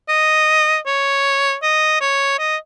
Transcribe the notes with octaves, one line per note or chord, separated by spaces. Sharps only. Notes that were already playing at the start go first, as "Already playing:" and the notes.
D#5
C#5
D#5
C#5
D#5